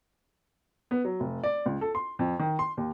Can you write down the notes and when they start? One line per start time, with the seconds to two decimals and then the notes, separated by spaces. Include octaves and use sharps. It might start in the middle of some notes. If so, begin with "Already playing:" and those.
0.91 B3
1.05 F#3
1.20 F1
1.43 D5
1.66 C#2
1.81 A4
1.95 C6
2.19 F2
2.40 D#3
2.59 C6
2.77 D#2